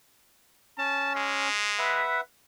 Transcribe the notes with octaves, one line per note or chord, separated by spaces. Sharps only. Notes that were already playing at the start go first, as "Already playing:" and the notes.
C#4 A5
G#3
B4 E5 F#5